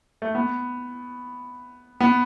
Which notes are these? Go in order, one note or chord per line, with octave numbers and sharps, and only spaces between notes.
A3
B3
B3